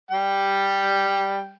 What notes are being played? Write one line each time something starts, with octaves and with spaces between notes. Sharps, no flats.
G3 G5